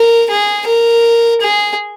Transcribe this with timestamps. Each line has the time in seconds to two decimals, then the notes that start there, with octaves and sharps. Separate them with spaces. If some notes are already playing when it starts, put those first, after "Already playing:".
Already playing: A#4
0.30 G#4
0.67 A#4
1.42 G#4